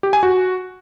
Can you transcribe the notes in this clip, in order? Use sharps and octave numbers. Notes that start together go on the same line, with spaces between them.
G4
G#5
F#4